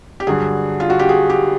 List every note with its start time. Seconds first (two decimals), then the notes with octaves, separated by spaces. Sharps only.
0.20 G4
0.27 G2 D3 F#3 G#4
0.80 F4
0.90 F#4
0.99 G4
1.09 G#4
1.30 G4